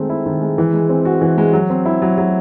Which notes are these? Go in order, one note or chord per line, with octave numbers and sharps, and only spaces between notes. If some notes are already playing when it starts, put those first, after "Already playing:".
Already playing: D#3 G#3 A3 C4
E4
D#3
G#3
E3
G#3
C4
F#4
E3
G#3
F#3
C4
E4
F#3
F#3